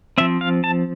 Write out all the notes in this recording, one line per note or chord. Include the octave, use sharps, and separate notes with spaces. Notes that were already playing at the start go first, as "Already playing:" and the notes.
F3 C4 E5
F5
A5